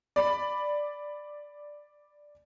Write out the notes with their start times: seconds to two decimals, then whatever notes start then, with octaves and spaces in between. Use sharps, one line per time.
0.16 D5 B5